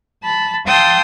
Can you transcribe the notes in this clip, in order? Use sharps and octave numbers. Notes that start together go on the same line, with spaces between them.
A5 B5
F5 G5 A5 C6 D#6 E6